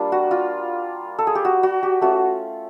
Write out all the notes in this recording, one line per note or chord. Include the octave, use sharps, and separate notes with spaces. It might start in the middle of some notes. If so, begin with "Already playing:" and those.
Already playing: G3 A#3 D4 F4
F#4
F4
A4
G#4
G4
F#4
F#4
G4
A3 C#4 F4 F#4